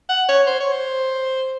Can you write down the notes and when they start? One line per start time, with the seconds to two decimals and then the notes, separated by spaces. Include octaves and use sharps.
0.09 F#5
0.28 C#5
0.47 C5
0.60 C#5
0.72 C5